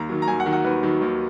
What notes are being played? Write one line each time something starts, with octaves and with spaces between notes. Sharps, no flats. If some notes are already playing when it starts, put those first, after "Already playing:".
Already playing: D#2 A#5
D#3 F#3
A#5
D#2 G#5
F#5
D#3 F#3
F#5
D#2 B4
D#3 F#3
D#2